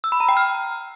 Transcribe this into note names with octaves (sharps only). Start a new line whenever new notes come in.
E6
B5
A#5
G5
F6